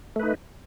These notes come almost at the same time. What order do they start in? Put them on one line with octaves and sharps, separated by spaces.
A3 B4 D#4